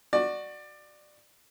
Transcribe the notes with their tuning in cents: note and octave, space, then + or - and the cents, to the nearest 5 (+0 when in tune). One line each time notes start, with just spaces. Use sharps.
F#4 +0 D5 +20